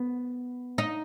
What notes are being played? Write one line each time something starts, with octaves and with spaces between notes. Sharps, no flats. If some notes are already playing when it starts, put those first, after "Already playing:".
Already playing: B3
D#4